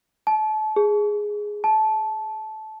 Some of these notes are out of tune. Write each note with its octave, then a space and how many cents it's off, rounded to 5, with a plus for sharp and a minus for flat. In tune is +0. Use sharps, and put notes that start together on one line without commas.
A5 -30
G#4 +0
A5 -15